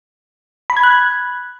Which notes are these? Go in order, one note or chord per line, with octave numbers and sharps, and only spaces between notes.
B5
G#6
F#6